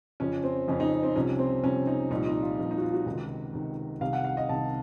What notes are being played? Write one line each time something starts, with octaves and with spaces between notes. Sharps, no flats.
F2 C#3 F3 C#4
C4
F2 C#3 F3 C#4
D#4
C4
C2 C3 F3 C#4
C4
C2 C3 F3 C#4
D#4
C2 A#2 F3 D#4
D#4
F4
C2 A#2 F3
D#4
F#4
F4
F#4
C#2 C3 D#3
C#2 C3 D#3
C2 C3 D#3 F5
F#5
F5
D#5
C2 C3 D#3 A5